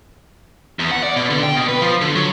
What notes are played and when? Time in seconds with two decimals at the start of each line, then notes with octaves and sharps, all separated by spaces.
0.79 E2
0.91 F#5
1.03 D5
1.16 B2
1.30 D3
1.43 G5
1.56 B2
1.69 B4
1.81 F3
2.01 D3
2.15 F#3